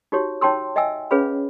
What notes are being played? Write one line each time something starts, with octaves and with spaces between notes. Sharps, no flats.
D#4 F#4 G4 C#5
D#4 C#5 G5 A5 C6 E6
D#5 E5 G5 G#5 E6
C#4 G#4 B4 C#5 F5 B5